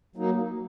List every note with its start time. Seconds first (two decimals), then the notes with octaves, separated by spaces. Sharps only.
0.16 F#3 A#3 D#4